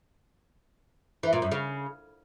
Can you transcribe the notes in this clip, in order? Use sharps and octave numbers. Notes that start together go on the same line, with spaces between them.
E3
A#2
F#2
C#3